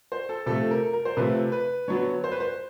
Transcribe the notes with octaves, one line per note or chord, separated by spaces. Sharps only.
C5
A4
C3 F3 A3 A4
A#4
A#4
C5
C3 F3 A3 B4
B4
D3 F#3 B3 C#5
C5
B4
C5